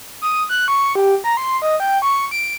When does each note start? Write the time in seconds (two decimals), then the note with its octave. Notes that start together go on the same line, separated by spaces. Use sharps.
0.22 D#6
0.49 F#6
0.68 C#6
0.95 G4
1.24 A#5
1.37 C6
1.62 D#5
1.80 G5
2.02 C#6
2.31 D7